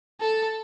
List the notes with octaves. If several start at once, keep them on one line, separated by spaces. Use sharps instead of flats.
A4